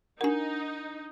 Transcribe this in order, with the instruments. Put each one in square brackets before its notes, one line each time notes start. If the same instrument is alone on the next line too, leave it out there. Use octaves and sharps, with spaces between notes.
[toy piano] D4 F#5 [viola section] D#4 [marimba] A#4 G#5